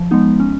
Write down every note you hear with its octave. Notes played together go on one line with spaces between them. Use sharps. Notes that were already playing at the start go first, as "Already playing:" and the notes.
Already playing: F3
G#3 B3 D#4
C#4